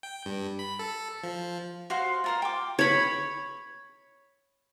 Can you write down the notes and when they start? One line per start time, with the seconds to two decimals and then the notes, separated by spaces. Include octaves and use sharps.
0.03 G5
0.25 G2
0.59 B5
0.79 A4
1.23 F3
1.90 F#4 C5 F5 C6
2.24 F4 A#4 C5
2.42 G5 D6
2.79 C#5 B5